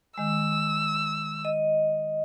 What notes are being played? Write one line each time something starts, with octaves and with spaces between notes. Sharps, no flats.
D#3 G#3 E6
D#5